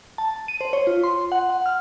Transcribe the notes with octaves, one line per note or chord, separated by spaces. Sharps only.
A5
D#7
C5
C#5
F4
C6
F#5
F#5
F6